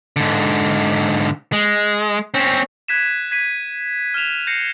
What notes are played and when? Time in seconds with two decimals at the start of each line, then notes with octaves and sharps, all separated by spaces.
0.16 G#2 D3
1.52 G#3
2.34 C4 C#4
2.88 F#6 G#6 B6 D#7 E7
3.31 G#6 B6 D#7 E7
4.14 F6 B6 E7 F7
4.47 G6 A#6 C7 C#7